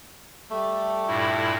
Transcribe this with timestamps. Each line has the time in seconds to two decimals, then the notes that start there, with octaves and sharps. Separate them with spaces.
0.52 G3 A3
1.07 G2 A#2 E4